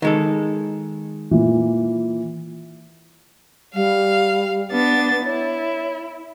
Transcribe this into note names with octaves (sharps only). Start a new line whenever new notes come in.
D#3 G#3 A4
A#2 E3
G3 F5
B3 D4 A6
E4 C#5